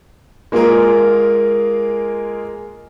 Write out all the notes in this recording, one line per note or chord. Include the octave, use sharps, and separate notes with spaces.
G#3 A#3 F4 G#4 A#4